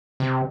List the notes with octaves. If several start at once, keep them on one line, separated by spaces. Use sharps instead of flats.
C3